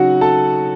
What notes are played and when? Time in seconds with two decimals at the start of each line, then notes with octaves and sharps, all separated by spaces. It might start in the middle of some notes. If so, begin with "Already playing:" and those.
Already playing: C#3 F#3 C#4 D#4 F#4 F#5
0.21 A4 A5